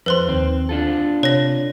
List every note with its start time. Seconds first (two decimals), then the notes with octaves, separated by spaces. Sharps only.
0.06 F2 B4 C5 C6
0.29 D#2 C4
0.69 D4 F4 A4
1.23 C3 C#5 A#6